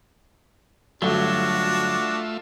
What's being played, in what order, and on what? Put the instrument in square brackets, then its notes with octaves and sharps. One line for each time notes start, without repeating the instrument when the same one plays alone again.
[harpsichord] D2 G2 [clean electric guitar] F#3 [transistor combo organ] A3 F4 E5 [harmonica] D4 F#4